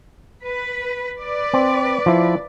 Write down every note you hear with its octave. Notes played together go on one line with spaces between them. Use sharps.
B4
B4 D5
C4
F3 E4